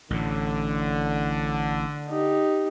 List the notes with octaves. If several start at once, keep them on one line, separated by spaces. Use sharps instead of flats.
A1 A2 D3
D#4 G4